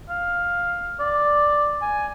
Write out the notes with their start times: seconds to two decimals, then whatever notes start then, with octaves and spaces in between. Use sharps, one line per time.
0.09 F5
1.00 D5
1.82 G#5